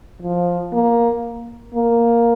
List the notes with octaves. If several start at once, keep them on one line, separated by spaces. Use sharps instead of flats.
F3
A#3
A#3